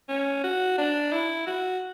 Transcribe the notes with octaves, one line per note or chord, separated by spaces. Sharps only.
C#4
F#4
D4
E4
F#4